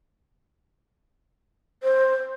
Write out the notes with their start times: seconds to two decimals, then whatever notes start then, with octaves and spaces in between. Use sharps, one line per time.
1.83 C5